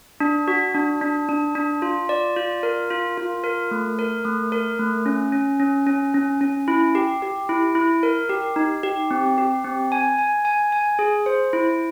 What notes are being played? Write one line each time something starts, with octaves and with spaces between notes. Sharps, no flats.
D4
F#4
D4
D4
D4
D4
F4
D5
F4
A#4
F4
F4
A#4
A3
A#4
A3
A#4
A3
C#4
C#4
C#4
C#4
C#4
C#4
E4
G4
G4
E4
E4
A#4
G4
D#4
G4
C4
G4
C4
G#5
G#5
G#5
G#5
G#4
C5
E4